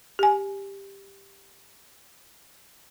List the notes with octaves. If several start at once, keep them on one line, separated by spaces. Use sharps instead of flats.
G4 G#5